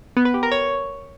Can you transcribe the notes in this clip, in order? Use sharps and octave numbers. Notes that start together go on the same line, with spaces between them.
B3
B4
G4
A#4
C#5